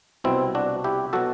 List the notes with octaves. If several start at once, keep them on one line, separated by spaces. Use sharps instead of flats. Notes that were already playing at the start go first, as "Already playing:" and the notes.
C2 B2 F#3 C4 E4
D4 F#4
E4 G4
B2 F#3 F#4 A4